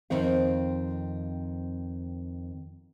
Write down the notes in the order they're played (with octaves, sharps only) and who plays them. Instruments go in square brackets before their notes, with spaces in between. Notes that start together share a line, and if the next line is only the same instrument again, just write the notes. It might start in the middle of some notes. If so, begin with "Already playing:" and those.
[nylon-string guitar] F2 D#3 C4 F5